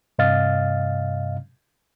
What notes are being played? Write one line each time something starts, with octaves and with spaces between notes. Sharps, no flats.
G2 C3 D#5 F5 F6 A6